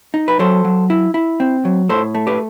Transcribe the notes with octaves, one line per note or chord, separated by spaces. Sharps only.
D#4
B4
F#3 A4 C5
F#3
E4
E4
C4
F#3
A2 A4 C5
A3
G4 B4